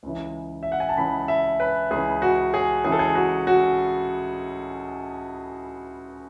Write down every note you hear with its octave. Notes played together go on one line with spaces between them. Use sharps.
C#2 C#3 E3
E5
F#5
G#5
A5
C#2 C#3 E3 B5
E5
B4
C#2 C#3 E3 G#4
F#4
G#4
C#2 C#3 E3 G#4
A4
G#4
F#4
F#4